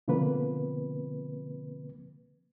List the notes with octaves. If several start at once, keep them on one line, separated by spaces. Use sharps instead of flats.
B2 D3 F3 A#3 C4 B4